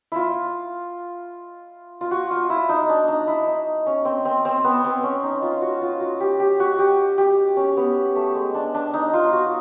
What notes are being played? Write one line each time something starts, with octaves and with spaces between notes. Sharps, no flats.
E4 F4
F4
F#4
F4
E4
D#4
D4
D#4
E4
D#4
C#4
C4
C4
C4
B3
C4
C#4
D#4
F4
F#4
F4
F#4
G4
G4
F#4
G4
G4
C#4
B3
A3
G#3
D4
D4
D#4
F4
F#4